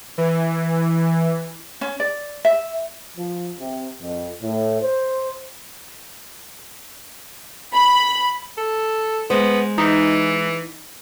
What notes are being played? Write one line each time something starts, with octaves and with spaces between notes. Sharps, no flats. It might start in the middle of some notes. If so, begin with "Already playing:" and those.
E3
C#4
D5
E5
F3
C3
F2
A2
C5
B5
A4
G#3 B3 C5
E3 D#4